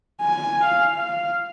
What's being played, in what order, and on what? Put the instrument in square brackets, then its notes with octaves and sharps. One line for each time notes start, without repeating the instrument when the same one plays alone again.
[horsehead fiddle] G#5
F5
F5